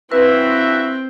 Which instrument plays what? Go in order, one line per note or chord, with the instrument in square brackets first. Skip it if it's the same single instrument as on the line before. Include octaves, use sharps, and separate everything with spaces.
[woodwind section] G2 E4 F#4 [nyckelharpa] C4 [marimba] B4 [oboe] E5